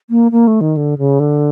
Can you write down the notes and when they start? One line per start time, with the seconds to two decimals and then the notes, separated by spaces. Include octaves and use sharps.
0.10 A#3
0.32 A#3
0.47 A3
0.61 D#3
0.77 D3
0.98 C#3
1.20 D3